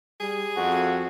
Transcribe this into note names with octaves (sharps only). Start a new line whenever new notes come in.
G3 G#4
F2 F#4